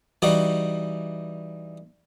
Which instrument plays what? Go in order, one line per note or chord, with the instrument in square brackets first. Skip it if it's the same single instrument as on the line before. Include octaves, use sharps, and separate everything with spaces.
[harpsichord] E3 G3 D#4 F#4